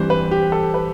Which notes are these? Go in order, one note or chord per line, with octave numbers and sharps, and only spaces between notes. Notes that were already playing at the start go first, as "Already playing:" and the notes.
Already playing: G2 E3 G3 C4 C5
B4
G4
A4
B4